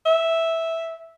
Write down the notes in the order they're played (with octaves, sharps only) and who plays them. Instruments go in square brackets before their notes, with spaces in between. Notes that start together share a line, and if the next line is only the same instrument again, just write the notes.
[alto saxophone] E5